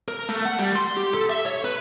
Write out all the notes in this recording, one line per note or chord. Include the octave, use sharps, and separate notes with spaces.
A#4
A3
F#5
G3
C6
G4
A4
E5
C#5
B4